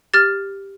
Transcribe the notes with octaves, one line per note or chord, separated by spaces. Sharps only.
G4 F6 A6